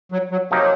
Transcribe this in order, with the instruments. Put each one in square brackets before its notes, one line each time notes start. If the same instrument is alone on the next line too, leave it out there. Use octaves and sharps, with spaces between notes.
[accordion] F#3
F#3
[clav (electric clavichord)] C3 F3 A#3 D#4 G4 [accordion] F#3